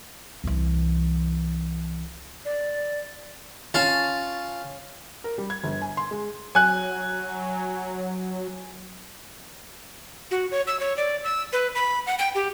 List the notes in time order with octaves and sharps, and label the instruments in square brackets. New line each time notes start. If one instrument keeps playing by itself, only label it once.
[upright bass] C2 E3
[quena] D5
[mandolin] C#4 A5 [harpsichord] F4
[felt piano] A#4
G3
G#6
G1
G#5
C6
G#3
[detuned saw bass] F#3 [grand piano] G#5 F#6
[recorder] F#4
C#5
E6
C#5
D5
E6
B4
B5
F#5
G5
G4